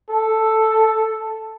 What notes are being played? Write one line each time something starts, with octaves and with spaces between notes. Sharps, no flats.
A4